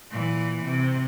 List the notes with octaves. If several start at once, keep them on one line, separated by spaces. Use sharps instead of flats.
A#2 E3
C3